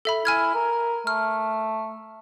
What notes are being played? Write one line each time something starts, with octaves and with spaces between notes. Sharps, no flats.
A4 E5 B5
E4 G#5 F6 G#6
A#4
A3 F6